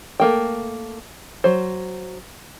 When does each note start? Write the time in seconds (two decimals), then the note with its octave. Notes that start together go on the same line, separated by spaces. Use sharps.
0.20 A3 A#3 G5
1.44 F#3 C5